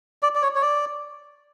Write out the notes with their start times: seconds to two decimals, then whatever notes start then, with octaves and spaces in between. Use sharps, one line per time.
0.23 D5
0.35 D5
0.42 C#5
0.55 C#5
0.62 D5